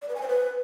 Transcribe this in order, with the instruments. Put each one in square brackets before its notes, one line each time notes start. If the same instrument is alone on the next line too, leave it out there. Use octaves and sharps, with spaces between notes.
[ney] D5
B4
G#5
C5
B4